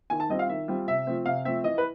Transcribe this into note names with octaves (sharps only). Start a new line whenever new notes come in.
D#3 G#5
A5
G3 C4 F4 D#5
F5
D#3 E5
G3 C4 F4
C3 E5
F3 A3 C4
C3 F5
F3 A3 C4 E5
E3 D#5
B4